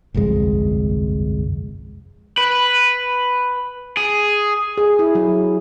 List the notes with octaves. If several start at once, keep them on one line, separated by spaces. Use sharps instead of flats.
G1 C2 F2 G#3
B4
G#4
G#4
E4
F#3